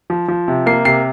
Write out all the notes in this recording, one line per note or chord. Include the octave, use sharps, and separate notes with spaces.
F3
F3
C3
A#3 C7
C3 C7